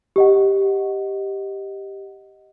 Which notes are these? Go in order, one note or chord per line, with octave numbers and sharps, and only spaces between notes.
G4 D#5 F#5